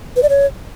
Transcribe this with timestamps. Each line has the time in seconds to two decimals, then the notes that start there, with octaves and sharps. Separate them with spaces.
0.16 B4
0.23 D5
0.29 C#5